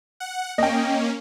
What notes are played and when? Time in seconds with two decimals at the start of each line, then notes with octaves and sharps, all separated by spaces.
0.20 F#5
0.58 A#3 C#4 D#5 G5